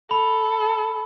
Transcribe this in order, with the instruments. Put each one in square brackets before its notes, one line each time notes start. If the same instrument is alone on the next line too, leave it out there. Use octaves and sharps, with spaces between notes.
[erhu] A4 [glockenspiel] B5